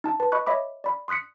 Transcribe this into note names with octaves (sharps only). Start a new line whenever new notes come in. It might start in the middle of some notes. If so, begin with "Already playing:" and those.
D#4 A5
B4 A5
D#5 B5 C#6 F#6
C#5 D#5 E5 B5 D6
D5 B5
C6 D#6 F#6 B6 C#7